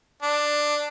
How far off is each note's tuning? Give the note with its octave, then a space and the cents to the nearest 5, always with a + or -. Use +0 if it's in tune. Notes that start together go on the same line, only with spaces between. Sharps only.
D4 +10